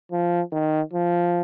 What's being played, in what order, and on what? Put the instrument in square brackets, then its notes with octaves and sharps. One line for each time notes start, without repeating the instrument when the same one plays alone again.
[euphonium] F3
D#3
F3